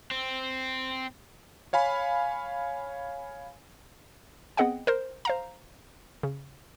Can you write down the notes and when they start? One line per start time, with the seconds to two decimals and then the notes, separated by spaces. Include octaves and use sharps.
0.11 C4
1.73 C#5 F5 G#5 B5
4.57 B3 C4 G#4 D#5 F#5 G5
4.87 A#4 C5
5.25 C5 F5 A#5
6.23 C#3